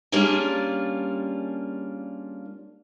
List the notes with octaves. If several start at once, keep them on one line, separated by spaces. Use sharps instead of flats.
G3 A#3 C#4 D4 F4 G#4